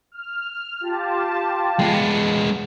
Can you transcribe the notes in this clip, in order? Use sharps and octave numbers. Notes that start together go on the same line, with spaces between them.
F6
F4 G4 A5
G#3 B3